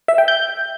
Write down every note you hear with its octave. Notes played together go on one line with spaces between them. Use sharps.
E5
G5
G6